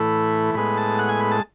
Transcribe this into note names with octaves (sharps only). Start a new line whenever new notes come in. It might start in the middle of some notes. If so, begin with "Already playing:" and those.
Already playing: A2 E3 A3 B5
A2 G#3 B3 B5
A5
F#5
G#5
B5
A5